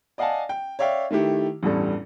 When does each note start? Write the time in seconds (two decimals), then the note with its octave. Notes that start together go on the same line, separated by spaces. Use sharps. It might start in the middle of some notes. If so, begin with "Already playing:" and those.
0.18 D5 D#5 F5 F#5 G#5 A5
0.49 G5
0.79 C#5 D5 E5 F5 G5
1.11 D#3 A3 E4 G4
1.63 A1 E2 G2 G3 A4